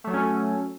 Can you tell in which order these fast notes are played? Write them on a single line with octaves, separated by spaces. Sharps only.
A3 F#3 A4 C#4